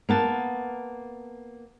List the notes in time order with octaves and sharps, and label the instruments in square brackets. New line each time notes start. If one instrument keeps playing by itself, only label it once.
[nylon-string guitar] A#3 B3 A5